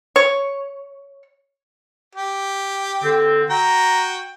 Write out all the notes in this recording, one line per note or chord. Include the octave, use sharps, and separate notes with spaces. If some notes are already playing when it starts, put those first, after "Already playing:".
C#5
G4
D3 C4
F#4 G5 A#5